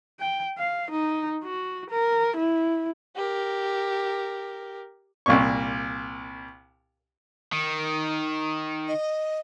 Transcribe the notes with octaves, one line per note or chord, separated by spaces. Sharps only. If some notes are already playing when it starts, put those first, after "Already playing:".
G5
F5
D#4
F#4
A#4
E4
G4 A#4
C2 A#2 C#6
D#3
D#5